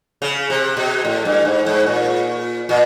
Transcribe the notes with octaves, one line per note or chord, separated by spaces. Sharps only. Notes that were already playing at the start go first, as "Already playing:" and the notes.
C#3
C3
B2
A2
G2
G#2
G#2
A#2
A#2